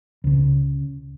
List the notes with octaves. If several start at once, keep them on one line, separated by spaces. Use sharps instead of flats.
C#2 C#3